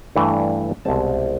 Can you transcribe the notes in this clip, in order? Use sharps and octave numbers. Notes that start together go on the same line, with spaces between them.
G2 E3 A3 D4
C2 B2 G#3 C4 A5